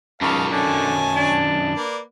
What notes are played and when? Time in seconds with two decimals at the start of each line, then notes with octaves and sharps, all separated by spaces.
0.22 C#2 F#2 D#3 D#5 F5 A5
0.52 D3 C#5 G#5 A5
1.16 D4
1.74 A#3 B4 D5